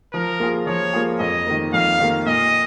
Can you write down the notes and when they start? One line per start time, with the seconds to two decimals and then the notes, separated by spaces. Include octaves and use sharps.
0.13 F3 A#4
0.40 A#3 F4 G#4
0.66 F3 C#5
0.93 A#3 F4 G#4
1.19 F2 D#5
1.47 D#3 A#3
1.73 F2 F5
2.00 D#3 A#3
2.26 A#2 D#5